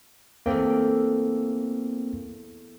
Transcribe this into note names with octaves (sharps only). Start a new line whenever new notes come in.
E2 A3 A#3 C4 G5